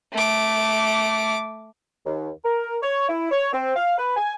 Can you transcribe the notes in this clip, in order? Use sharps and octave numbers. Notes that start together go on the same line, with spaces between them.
A3 D6
D#2
A#4
C#5
E4
C#5
C4
F5
B4
G#5